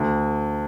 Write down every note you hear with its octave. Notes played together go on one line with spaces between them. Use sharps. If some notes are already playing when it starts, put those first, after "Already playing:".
Already playing: D2